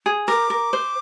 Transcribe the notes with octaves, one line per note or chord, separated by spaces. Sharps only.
G#4
A#4 D6
A#4
C5